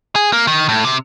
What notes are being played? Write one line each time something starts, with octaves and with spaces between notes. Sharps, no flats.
G#4
A#3
D#3
A2
C3